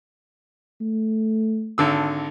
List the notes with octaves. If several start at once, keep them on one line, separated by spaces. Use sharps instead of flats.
A3
G#1 D3 E6